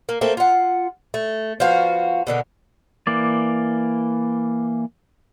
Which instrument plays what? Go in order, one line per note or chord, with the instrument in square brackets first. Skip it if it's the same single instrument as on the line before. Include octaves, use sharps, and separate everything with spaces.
[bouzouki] A#3
A3 A#3 C4 A4
F4 F#5
A3
F3 B3 F#4 F5
B2 D3 D#3 D4
[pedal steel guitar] E3 A#3 D5